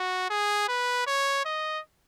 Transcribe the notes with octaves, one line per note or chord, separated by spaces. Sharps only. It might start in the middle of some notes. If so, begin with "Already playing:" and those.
Already playing: F#4
G#4
B4
C#5
D#5